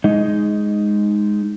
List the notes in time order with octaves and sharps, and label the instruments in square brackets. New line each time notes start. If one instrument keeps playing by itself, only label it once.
[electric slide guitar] G#3 D#4 D#5